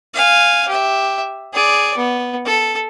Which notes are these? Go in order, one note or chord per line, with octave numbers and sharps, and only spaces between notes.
F5 G#5
G4 E5
G#4 D5
B3
A4